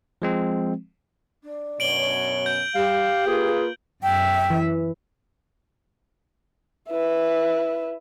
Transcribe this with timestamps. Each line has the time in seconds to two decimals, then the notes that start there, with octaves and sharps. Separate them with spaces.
0.22 F3 G#3 C4
1.43 D4
1.80 F#2 B2 C#5 D7 F#7 G7
2.46 G6
2.75 G3 G4 F5
3.27 A#3 F4 G#4 B4
4.03 F#2 E5 G5
4.50 E3
6.89 E4 B4